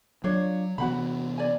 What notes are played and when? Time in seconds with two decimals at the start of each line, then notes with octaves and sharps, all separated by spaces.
0.24 F#3 D4 F4 C#5
0.78 C3 E3 B3 F#4 F#5 B5
1.38 D5 G#5